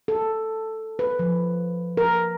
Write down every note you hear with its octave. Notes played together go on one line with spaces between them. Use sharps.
A4
B4
F3
A#4